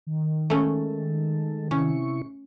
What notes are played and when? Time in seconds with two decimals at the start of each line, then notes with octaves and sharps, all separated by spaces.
0.07 D#3
0.50 G#3 A3 C#4 A4
1.71 C3 C#4 E4 C#6